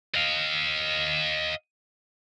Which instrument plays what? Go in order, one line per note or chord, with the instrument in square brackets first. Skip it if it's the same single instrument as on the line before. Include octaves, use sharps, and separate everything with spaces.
[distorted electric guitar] D#5 F5